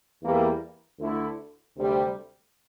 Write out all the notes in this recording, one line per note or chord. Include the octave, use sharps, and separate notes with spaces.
E2 E3 G3 A#3 E4
D2 D3 A3 E4
D2 C3 G3